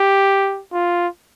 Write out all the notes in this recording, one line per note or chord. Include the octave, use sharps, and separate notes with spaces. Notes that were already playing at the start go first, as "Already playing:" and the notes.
Already playing: G4
F4